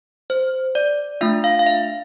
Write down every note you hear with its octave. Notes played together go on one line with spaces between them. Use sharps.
C5
D5
A3 D4 F4 E5
F5
F5
E5